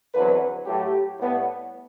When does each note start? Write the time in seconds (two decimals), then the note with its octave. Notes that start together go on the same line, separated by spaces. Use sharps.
0.14 E2 D3 F#3 C4 B4
0.65 A2 F#3 A3 G4
1.19 A2 G3 B3